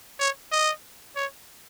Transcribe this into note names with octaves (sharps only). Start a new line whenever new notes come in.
C#5
D#5
C#5